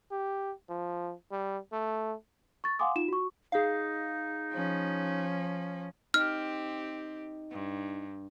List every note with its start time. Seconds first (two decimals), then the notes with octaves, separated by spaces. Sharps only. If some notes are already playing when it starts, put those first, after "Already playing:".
0.11 G4
0.69 F3
1.31 G3
1.72 A3
2.64 C#6 A6
2.79 F5 F#5 G#5 C6 D6 D#6
2.96 D#4 F4 E7
3.08 F#4 C#6
3.52 D#4 G#4 F5
4.52 F3 C#4
6.14 C4 D#4 G4 D#5 F6
7.51 G2